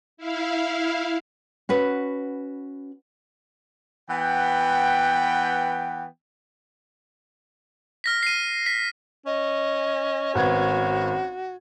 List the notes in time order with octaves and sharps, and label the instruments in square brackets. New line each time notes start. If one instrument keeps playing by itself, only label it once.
[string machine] E4 F5
[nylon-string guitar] C#4 F#4 B4
[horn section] E3 B3 F#5 G5
[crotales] F6 A#6 B6
C7 D#7
B6
[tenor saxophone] C#4 [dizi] D#5
[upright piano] G#1 B3 G#6 [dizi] F#4